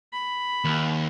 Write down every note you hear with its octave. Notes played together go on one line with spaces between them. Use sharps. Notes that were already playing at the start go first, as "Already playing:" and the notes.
B5
D#2